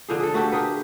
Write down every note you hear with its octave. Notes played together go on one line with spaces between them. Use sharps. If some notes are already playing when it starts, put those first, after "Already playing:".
D3 F3 G#4
G#4 A4
A3 F#4 G4 A4
G4 G#4 A#4 B4